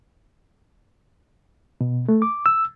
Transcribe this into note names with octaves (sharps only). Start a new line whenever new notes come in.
B2
A3
D6
E6